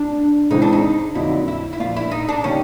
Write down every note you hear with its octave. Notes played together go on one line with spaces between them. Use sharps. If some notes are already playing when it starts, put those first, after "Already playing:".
Already playing: D4
C#3 E3 G#3 C4 D#4 E4
D4
D#4
F2 D3 F#3 A#3 D#4 E4
E4
E4
A#2 F3 A#3 D4 F4
E4
D#4
D4
D#3 G3 A#3 C#4 D#4